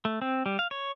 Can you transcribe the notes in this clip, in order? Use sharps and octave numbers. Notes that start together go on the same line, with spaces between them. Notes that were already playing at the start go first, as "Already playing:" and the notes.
A3
C4
G3
F5
C#5